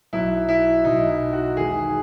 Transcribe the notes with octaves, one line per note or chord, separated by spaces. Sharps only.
B1 B2 F#3 E4
E4
B1 B2 F#3 D#4
E4
F#4
E2 D#3 G#3 G#4